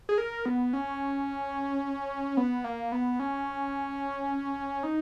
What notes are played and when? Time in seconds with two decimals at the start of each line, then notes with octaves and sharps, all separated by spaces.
0.09 G#4
0.18 A#4
0.46 B3
0.73 C#4
2.37 B3
2.64 A#3
2.92 B3
3.20 C#4
4.83 D#4